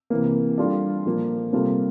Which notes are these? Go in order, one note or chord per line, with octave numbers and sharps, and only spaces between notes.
C3 E3 A#3
G3 D4 F4 A4 D5
A#2 F3 A#3
C3 G3 A#3 F4 A4